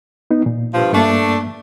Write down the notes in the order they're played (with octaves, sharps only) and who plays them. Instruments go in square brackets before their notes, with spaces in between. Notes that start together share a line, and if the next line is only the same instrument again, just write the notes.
[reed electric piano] B3 D#4
A#2
[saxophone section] G2 F3
[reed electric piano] G2 A#3 [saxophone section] A3 D4